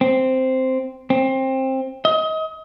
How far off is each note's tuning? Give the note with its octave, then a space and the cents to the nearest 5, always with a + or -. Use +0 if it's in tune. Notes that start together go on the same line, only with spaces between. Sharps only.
C4 -5
C4 +20
D#5 +30